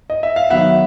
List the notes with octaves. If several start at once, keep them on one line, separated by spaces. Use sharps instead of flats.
D#5
E5
F5
D#3 F#3 B3 E5 F#5